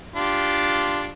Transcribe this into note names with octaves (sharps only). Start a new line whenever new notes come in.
D4 F4 G4